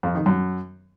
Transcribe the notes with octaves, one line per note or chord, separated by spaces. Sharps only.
F2
D#3
F#2